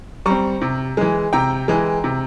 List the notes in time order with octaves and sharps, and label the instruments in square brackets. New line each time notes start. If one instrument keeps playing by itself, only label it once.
[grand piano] G3 C4 A#5 C#6
C3
E3 G#3
C3 G5 A#5
E3 G#3
C3